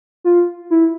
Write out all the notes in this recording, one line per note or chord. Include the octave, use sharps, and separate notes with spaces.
F4
E4